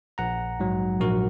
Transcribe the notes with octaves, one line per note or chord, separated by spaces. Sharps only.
A#1 F#5 A#5
G#2 F#3
A#1 F#4 A#4